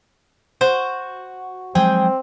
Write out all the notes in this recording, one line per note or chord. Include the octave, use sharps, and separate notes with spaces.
F#4 C5
F3 F#3 G#3 C4 G#4 G5